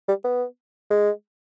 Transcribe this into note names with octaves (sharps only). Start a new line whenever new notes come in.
G3
B3
G#3